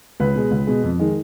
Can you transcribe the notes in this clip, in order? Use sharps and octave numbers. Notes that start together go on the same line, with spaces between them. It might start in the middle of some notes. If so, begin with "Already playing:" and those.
C#2 B4
B2 G#3
C#2
B2 G#3
F2
D#3 G#3